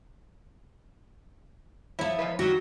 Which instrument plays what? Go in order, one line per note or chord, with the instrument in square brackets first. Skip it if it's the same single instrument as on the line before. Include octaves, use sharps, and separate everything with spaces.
[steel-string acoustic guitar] F3 C#5 [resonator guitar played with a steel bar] E4
[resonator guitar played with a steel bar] E2 G#3 B4
[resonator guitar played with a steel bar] D#3 F#3 G3 [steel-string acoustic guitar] F#4